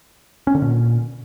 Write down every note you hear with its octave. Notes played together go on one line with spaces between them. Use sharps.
C#4
D3
A#2